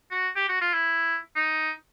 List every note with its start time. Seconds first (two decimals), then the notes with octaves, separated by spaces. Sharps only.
0.11 F#4
0.36 G4
0.49 F#4
0.62 F4
0.74 E4
1.36 D#4